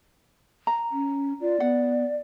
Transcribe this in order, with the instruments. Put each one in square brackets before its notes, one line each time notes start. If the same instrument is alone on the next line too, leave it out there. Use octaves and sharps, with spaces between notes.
[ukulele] A#5
[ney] C#4
[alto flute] F4 [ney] D5
[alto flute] B3 [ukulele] F#5